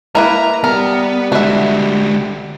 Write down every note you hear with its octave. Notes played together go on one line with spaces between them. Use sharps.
A#3 E4 B4 A#5
G3 B3 A#4
D3 G#3 F#4 E5